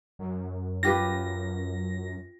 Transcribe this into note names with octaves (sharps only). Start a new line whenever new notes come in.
F#2
F4 G4 B4 A#6